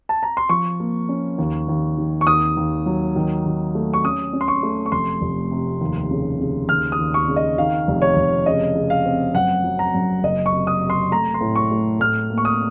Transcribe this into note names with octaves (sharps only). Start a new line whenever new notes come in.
A5
A#5
C6
F3 C#6
A#3
C#4
D#2
D#2
D#3
C#6
D#2 D#6
D#2
F#3
D#3
D#3
A3
C#6
C#4 D#6
C#4
C6
C#6
A3
C#6
F1 C6
F1
C3
D#2
C#3
C#3
D#2 F6
D#6
D#2
C#6
C#3
D#5
D#3 F5
F1
C#5
F1
C#3 D#5
C#3
F5
C4
F#2 F#5
F#3
A#5
F#2
F#1 D#5
C#6
C3
D#6
C3
C6
A3 A#5
C6
A2
C#6
A3
A2 F6
A#3
C#6
D#6